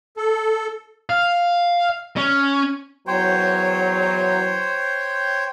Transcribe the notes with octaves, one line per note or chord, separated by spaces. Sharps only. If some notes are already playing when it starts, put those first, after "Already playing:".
A4
F5
C#4
E2 E3 F#3 C5 C#5 G5